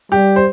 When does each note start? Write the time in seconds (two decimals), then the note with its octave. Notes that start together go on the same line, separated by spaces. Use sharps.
0.12 G3 G4
0.36 C5